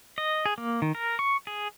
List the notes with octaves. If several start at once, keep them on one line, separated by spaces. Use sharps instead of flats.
D#5
G#4
A#3
D#3
A#4
C#6
G#4